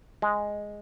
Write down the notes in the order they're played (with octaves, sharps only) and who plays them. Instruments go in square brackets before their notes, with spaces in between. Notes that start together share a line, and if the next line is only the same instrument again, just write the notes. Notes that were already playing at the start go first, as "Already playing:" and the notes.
[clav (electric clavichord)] G#3